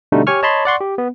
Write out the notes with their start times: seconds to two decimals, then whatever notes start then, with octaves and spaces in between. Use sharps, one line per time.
0.12 B2 D3 G3 A3 D4 D#4
0.27 G4 C#5 G#5 C#6 F6
0.43 C#5 D#5 A5 B5 C6
0.65 D5 F#5 C6 C#6
0.81 G4
0.98 B3